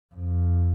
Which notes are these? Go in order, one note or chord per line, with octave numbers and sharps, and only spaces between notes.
F2